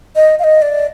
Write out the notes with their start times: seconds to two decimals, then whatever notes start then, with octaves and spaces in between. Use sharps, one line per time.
0.16 D#5
0.39 F5
0.44 D#5
0.62 D5